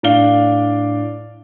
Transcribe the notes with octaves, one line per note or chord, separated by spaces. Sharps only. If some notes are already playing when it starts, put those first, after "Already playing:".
A2 D4 D5 F5 G7